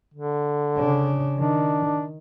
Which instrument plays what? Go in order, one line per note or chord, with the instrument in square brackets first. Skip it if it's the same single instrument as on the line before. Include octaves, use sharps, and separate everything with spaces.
[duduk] D3
[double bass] C#3 D4
[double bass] D#3 [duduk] D4